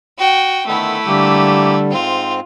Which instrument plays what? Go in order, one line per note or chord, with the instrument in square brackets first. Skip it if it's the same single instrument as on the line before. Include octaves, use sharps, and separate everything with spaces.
[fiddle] F#4 G5
[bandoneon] D3 D#3 B3 [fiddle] A3 E4
[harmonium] D3 G3 [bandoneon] A#3 G4
[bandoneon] G#2 C4 [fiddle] F4